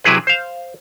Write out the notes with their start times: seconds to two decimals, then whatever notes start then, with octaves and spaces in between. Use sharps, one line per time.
0.04 C3 F#3 E4 G#4 B4
0.27 C5 F5